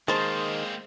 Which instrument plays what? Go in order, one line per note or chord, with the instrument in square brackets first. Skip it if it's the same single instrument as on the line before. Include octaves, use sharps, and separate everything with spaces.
[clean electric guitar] D#3 [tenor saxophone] G#3 [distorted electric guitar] A#3 C4 [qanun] C5 A5